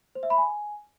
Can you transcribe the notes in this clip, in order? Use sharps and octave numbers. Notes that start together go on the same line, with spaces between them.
C5
E5
B5
G#5